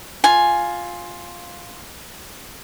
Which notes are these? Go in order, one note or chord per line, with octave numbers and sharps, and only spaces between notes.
F4 G#5